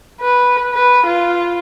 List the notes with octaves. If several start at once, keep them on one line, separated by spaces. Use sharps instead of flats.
B4
B4
F4